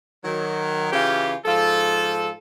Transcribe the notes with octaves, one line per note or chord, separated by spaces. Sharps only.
D#3 F#3
C#3 E3 F4 G4
G#2 F3 F4 A4